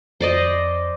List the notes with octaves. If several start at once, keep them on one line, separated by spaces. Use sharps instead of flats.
F2 C5 D5 D#5